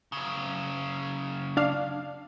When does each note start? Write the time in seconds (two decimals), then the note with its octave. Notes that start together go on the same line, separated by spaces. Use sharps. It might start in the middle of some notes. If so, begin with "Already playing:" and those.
0.12 F#2 C#3
1.57 D4 F5